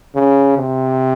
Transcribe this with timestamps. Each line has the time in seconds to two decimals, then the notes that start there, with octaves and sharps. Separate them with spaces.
0.15 C#3
0.58 C3